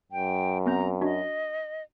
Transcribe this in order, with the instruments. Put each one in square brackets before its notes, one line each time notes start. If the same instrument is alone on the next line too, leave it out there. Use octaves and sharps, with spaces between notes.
[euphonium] F#2 [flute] G5
[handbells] B3 C4 G6 [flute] A#5
[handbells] D4 F#4 [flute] D#5